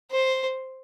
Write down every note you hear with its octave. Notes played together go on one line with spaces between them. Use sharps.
C5